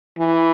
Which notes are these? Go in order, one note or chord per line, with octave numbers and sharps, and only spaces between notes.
E3